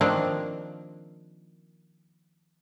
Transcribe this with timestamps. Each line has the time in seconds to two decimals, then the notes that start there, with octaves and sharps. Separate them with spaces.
0.01 D#3 F3 A#3 C4 D4